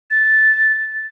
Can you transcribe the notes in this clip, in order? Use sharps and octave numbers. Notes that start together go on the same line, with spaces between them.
A6